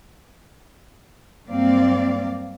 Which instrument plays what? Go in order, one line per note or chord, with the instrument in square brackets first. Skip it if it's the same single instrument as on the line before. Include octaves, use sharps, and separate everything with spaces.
[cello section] G2 F#3 A#3 C4 D5 F5